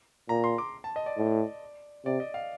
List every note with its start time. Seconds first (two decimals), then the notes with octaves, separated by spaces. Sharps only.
0.29 A#2 A#5
0.44 C6
0.58 D6
0.84 A5
0.96 D#5
1.06 D5
1.17 A2
2.05 C3 D5
2.20 D#5
2.34 F5